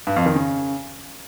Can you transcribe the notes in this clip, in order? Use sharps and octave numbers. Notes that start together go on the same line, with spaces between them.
G2
F2
D#3
C#3